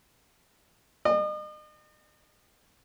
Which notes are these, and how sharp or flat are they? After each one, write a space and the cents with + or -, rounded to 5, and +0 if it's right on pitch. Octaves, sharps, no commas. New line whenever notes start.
D#5 -40